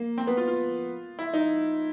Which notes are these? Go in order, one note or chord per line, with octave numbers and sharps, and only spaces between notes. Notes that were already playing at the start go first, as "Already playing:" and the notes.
Already playing: A#3
C4
B3
F4
F4
E4
D#4